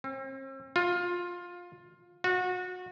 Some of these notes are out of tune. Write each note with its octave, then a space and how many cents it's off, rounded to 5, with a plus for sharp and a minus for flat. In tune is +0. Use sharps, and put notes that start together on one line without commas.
C4 +45
F4 +15
F#4 -25